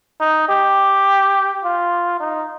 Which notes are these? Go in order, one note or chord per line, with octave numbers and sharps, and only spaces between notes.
D#4
G4
F4
D#4